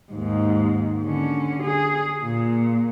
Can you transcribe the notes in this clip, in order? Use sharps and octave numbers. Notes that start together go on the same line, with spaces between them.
D#2 G#2
D3 C#4
G#4
A#2